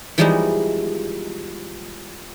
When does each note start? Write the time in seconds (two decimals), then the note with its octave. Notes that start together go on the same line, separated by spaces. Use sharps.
0.18 E3 F3 G3 G#3 B3 D#4